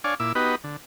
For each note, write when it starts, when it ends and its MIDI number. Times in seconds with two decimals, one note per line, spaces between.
0.04 0.15 62
0.04 0.15 73
0.04 0.15 74
0.04 0.15 77
0.04 0.15 80
0.20 0.32 46
0.20 0.32 64
0.20 0.32 86
0.20 0.32 88
0.35 0.55 59
0.35 0.55 63
0.35 0.55 66
0.35 0.55 67
0.35 0.55 71
0.35 0.55 75
0.64 0.77 50